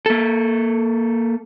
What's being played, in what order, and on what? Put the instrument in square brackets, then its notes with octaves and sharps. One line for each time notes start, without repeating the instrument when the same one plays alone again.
[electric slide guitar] A#3 A4